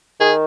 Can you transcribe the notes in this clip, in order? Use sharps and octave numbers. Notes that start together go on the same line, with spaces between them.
D#3 G#4